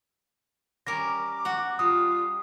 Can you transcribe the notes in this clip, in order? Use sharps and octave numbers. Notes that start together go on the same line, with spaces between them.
G3 C#4 A#4 D6 A#6
F#4 F#5
G3 F4 D#6